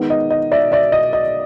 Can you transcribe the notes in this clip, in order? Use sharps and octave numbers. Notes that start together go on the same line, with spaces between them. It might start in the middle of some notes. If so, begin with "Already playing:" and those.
Already playing: D#3 G#3 B3
D#5
D#5
D5 E5
D5 E5
D#5
D#5